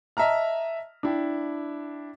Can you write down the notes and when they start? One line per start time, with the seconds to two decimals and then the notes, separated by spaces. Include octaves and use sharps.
0.17 D#5 E5 A5 A#5 F6
1.03 D4 E4 G5